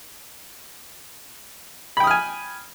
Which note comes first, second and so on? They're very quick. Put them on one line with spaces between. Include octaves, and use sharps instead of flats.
B5 G5 D#6 F6 G#5